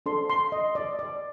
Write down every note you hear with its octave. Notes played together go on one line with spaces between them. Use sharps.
D4 A4 C5 C6
C6
D#5
D5
D5